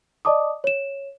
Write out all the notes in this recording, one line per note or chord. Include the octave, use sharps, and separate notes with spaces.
D5 D#5 A5 D6 D#6
C#5 E7